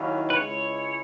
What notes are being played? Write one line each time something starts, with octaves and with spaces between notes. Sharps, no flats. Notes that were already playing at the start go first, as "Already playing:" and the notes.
Already playing: D#2 D#3 F#3 C#4 E4
B4
C#2 C#3 G#3 C#4 E4 C#5